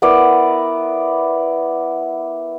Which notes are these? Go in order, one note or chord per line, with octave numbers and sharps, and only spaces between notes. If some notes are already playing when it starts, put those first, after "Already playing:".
B3 E4 A#4 D5